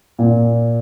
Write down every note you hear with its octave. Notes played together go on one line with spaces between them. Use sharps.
A#2